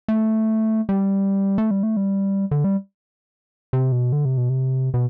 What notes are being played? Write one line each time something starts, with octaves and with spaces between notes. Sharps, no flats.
A3
G3
A3
G3
A3
G3
D3
G3
C3
B2
D3
C3
B2
C3
B2